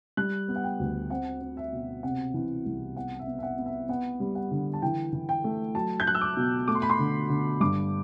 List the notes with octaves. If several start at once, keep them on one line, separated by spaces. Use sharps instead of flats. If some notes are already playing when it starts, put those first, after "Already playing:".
G3 F#6
B3
F#5
G5
D2
C4 F#5
C4
E5
B2
C3 F#5
E3
C2
B3 F#5
E5
B3
E5
F#5
B3
E5
B3 F#5
G3
F#5
D3
A5
E3 G5
E3
G5
A3
F#3 A5
G6
F#3 F#6
E6
D6
B2
A3 D6
C6
B5
C6
D3
D3
G2 D6